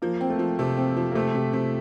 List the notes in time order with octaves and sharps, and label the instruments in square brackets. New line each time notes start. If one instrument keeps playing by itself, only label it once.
[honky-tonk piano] F3 [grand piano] A#3
[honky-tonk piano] C4
[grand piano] A3
[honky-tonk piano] F3
[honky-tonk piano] C3 [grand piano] A3
[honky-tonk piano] C4
F3
[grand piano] A#3
[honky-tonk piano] C3 [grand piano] A3
[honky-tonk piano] C3
C3